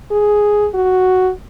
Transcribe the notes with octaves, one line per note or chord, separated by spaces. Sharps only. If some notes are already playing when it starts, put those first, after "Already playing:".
G#4
F#4